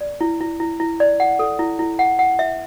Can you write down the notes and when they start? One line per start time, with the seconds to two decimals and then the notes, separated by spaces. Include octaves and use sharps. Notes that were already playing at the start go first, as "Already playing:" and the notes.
0.01 D5
0.21 E4
0.41 E4
0.60 E4
0.80 E4
1.00 D5
1.20 F#5
1.39 A4
1.59 E4
1.79 E4
1.99 F#5
2.19 F#5
2.39 E5